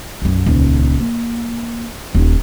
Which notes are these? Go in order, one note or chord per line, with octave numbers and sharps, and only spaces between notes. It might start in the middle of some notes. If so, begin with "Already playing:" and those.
B1 F#2
D#1 C#2
A#3
D#1 D#4